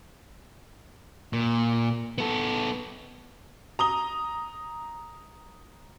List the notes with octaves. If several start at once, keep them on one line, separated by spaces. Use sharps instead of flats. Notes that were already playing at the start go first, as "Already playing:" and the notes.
A#2
B3 A4
A#5 D#6 G7